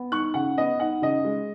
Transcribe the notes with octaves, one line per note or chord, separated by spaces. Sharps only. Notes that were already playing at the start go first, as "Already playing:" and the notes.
Already playing: B3
D#4 C#6 F#6
C#3 F#5
B3 D#5
D#4 F#5
C#3 D#5
G#3